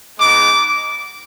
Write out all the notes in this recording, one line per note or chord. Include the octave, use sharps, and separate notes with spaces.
G#3 B3 D#4 D6